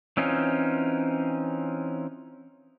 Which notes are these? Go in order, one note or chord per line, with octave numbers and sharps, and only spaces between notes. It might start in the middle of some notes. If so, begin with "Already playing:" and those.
E3 C4 C#4 D#4 F4